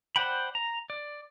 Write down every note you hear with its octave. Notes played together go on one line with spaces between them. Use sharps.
C5 D5 F#5 G5 B5
A#5
D5